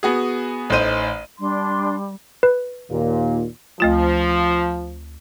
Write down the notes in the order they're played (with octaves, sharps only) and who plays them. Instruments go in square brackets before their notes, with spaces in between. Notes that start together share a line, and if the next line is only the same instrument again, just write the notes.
[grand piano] B3 F#4 G#4
A1 D#4 C5 D#7
[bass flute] G3 [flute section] D4 C6
[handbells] B4
[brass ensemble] D#2 A#2
[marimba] D2 A3 F4 [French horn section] F3